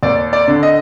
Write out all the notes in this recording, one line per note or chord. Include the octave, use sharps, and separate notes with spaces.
D#2 D5
D5
D3
D#5